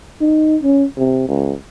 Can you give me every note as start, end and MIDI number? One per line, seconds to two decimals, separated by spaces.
0.21 0.57 63
0.63 0.85 61
0.98 1.28 48
1.28 1.54 37